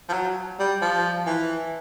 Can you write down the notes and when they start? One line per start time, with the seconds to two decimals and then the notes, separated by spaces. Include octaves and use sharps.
0.09 F3
0.13 F#3
0.59 G3
0.82 F3
1.26 E3